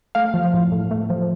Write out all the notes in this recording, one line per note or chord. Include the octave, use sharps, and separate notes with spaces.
A3 F5
F3
A2
A2
A3
F3